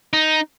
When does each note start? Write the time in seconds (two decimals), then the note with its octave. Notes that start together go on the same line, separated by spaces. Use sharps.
0.13 D#4